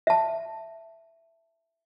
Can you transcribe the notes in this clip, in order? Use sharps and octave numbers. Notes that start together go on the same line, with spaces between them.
E5 A5